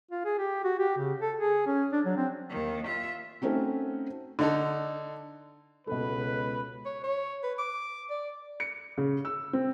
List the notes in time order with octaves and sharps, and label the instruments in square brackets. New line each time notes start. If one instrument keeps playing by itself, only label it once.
[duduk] F4
G#4
G4
F#4
G4
C#3
A4
G#4
C#4
D4
F#3
C4
[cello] D#2 D#3
F4 E5
[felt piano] A3 C4 C#4 D#4 F#4
[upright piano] D3 D#4 A4
[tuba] C#2 [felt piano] B2 A4 [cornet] B4
[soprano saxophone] C#5
C#5
B4
D6
D5
[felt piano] C#7
C#3
E6
C4